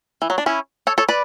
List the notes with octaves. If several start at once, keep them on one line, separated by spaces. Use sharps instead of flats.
E3
F#3
D4
C#4 E4
A4 C#5
A4 C#5
B4 D5